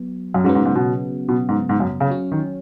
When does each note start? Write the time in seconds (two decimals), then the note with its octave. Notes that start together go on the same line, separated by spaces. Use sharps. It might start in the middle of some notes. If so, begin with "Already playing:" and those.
Already playing: F#3 B3
0.34 F#2
0.44 G#2 C#3 F#3 B3
0.55 G#2
0.65 G#2
0.75 B2
1.28 B2
1.49 G#2
1.69 G#2
1.80 F#2
2.00 C#3
2.10 F#3 C#4
2.32 D#3